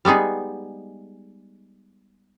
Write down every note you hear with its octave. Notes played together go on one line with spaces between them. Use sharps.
G3 G#3 B3 D#4 G#4